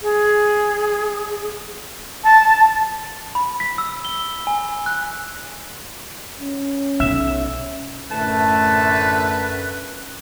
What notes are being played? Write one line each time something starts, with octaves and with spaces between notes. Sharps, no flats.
G#4
A5
B5
B6
E6
G7
G#5
F#6
C#4
B1 E5
F#2 A2 D3 A3 B4 A5